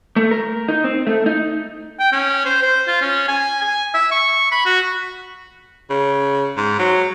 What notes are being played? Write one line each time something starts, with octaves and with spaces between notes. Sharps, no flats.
A3
A#4
D#4
C4
A3
D#4
G5
C#4
C5
C5
F4
C#4
G#5
G#5
E5
C#6
B5
F#4
C#3
G#2
F#3